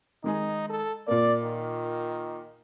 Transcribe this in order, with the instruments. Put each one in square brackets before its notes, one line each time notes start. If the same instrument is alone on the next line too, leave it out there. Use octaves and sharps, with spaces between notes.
[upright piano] D#3 G#3 G#4 [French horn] D#4
[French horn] A4
[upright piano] A#2 A#3 [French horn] D5
[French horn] D#3